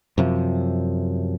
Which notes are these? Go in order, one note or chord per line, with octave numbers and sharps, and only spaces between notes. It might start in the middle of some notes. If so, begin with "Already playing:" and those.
F#2 C3 F3